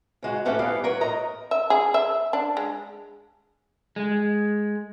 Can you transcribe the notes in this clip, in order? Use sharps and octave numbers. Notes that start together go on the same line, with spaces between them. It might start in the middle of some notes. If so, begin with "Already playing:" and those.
C#3 G#3 F#4
A2 E3 A3 C#4 F#4 G4
E3 G3 B3 G4 F5
A#4 B4 C#5
A2 D#5 A#5
E5
G#4
E5
D4
G#3
G#3